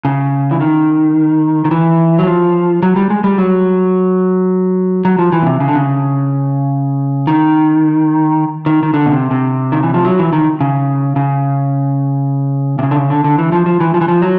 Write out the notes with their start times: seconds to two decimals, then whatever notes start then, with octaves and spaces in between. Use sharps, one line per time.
0.05 C#3
0.51 E3
0.60 D#3
1.65 D#3
1.71 E3
2.19 F#3
2.27 F3
2.83 F#3
2.96 G3
3.10 G#3
3.24 G3
3.38 F#3
5.05 F#3
5.19 F3
5.32 E3
5.43 B2
5.46 C3
5.60 C#3
5.68 D3
5.76 C#3
7.27 D#3
8.66 D#3
8.83 D#3
8.94 D3
9.06 B2
9.12 C3
9.31 C3
9.72 D#3
9.83 E3
9.94 F3
10.05 F#3
10.19 E3
10.33 D#3
10.61 C#3
11.16 C#3
12.79 C3
12.83 C#3
12.91 D3
12.97 C#3
13.10 D3
13.24 D3
13.38 E3
13.52 F3
13.66 F3
13.80 E3
13.94 F3
14.01 E3
14.08 F3
14.22 F#3